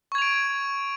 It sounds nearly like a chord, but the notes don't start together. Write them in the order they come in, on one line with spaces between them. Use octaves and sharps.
C#6 G#6 F7 D7